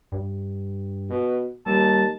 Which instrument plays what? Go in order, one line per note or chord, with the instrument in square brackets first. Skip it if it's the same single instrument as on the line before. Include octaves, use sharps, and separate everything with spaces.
[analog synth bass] G2
[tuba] B2
[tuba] D#2 [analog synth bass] G3 [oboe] A5